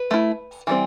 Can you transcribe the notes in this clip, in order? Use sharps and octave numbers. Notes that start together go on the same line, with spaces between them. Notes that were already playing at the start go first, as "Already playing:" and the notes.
Already playing: B4
A3 E4
E3 G3 C4